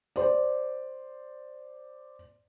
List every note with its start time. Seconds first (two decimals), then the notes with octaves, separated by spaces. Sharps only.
0.16 C5 D5